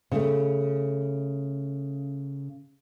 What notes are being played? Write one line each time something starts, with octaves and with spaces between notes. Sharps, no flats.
C#3 A3